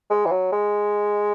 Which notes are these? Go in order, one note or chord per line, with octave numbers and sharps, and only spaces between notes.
G#3
E3
F#3
G#3